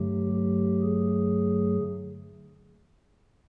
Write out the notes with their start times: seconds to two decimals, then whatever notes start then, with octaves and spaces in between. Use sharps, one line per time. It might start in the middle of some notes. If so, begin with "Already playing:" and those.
Already playing: G2 D3 F#3 A3 G4
0.32 G4
0.82 G#4